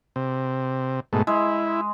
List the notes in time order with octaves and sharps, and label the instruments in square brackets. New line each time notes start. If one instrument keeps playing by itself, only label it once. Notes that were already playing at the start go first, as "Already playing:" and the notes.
[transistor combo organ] C3
G#2 B2 A3
[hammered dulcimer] G#3 [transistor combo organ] E4